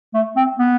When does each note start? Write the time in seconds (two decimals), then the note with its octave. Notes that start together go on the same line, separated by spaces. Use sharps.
0.14 A3
0.36 C4
0.59 B3